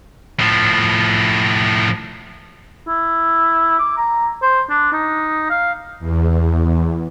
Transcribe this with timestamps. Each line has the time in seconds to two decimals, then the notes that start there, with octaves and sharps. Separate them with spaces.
0.40 A2 F3
2.88 E4
3.79 D6
3.97 A#5
4.42 C5
4.70 D4
4.93 D#4
5.50 F5
5.99 E2